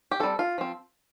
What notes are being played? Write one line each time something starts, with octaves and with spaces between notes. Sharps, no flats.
G4
G3 C4 A4
F4
F3 C4